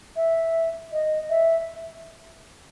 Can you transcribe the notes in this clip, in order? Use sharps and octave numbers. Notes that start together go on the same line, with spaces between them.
E5
D#5
E5